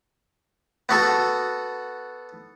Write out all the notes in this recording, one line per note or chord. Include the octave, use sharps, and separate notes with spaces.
B3 F#4 A4